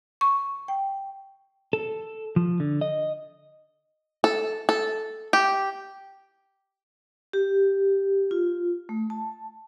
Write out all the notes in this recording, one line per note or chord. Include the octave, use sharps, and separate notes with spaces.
C#6
G5
A4
F3
D3
D#5
A4
A4
G4
G4
F4
A3
A5